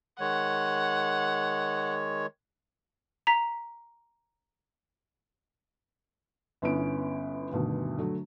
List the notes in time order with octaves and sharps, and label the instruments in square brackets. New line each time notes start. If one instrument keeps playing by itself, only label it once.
[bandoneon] D#3 G#3 C#5 [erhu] F#5
[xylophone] A#5 B6
[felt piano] G1 B3 C#4 E4 D7
D2 G2 B2 D#3
D3 F#3 A3